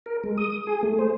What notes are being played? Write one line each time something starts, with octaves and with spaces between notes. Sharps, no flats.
A#4
G#3
D#6
G#4
A3
C5